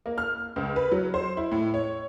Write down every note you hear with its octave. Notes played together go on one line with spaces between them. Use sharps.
A#3
F6
C#2
B4
F#3
C5
E4
A2
C#5